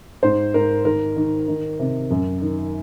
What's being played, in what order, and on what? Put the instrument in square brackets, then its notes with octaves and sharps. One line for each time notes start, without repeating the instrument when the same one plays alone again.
[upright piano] G#2 C5
G#2 A#4
D#3 A#4
D#3
D#3
C3
F#2
D#3